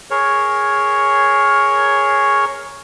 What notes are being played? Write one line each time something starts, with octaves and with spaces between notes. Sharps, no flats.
G#4 A#4 C#5